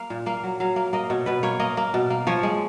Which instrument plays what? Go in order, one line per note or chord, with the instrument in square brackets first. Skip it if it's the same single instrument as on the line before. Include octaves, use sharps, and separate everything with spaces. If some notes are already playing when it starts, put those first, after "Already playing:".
Already playing: [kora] A#3 F5
A#2
A#3 F5
F#3
F#3 F5
A#3
A#3 D#5
B2 C#5
B2 B4
A#3 C#5
A#3 D#5
A#3
B2
A#3
F3 C#5
G#3